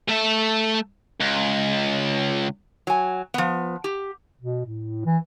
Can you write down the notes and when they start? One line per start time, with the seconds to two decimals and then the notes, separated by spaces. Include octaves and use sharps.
0.09 A3 E5
1.21 C#2
2.87 F#3 G#5
3.34 F3 B3
3.84 G4
4.41 B2
4.66 A2
5.06 E3